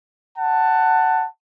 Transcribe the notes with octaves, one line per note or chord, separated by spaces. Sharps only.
F#5 A5